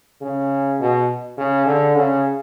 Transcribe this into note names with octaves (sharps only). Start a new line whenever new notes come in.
C#3
B2
C#3
D3
C#3